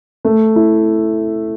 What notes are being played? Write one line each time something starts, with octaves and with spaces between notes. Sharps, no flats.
A3
E4